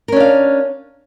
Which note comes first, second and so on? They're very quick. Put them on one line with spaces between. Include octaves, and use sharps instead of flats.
A#4 C#4 D4 F5